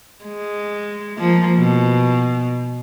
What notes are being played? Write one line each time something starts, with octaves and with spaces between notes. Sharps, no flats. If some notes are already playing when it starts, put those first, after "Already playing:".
G#3
F3 A#3
B2